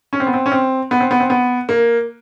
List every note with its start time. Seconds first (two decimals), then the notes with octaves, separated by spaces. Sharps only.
0.13 C#4
0.20 C4
0.27 B3
0.34 C4
0.46 C#4
0.52 C4
0.91 B3
1.00 C4
1.11 B3
1.20 C4
1.30 B3
1.69 A#3